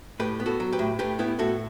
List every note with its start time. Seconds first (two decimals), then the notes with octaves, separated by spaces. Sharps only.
0.20 A2 G4 B4
0.40 B3
0.46 F#4 A4
0.60 F#3
0.72 G4 B4
0.79 A2
0.99 A2 G4 B4
1.19 B3 E4 G4
1.39 A2 F#4 A4